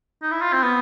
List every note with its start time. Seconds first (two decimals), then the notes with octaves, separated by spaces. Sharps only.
0.22 D#4
0.31 E4
0.42 F4
0.53 C4
0.63 B3